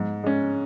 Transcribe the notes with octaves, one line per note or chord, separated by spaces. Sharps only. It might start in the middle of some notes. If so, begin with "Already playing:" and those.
Already playing: G#2
G#3 C#4